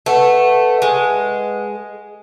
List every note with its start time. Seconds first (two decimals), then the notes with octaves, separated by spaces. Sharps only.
0.06 A3 B4 F#5
0.82 G#3